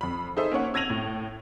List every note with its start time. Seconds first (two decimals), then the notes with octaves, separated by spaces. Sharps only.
0.01 F2 B5
0.37 D#4 G#4 A4 C5 E5
0.51 A#3 C#4 C#5 F#5
0.74 E6 G#6 A#6 D#7 F7 F#7
0.90 A2